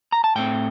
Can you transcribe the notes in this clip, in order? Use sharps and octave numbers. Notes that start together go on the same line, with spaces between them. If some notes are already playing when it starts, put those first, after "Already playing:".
A#5
A5
A2 A3 C4 G5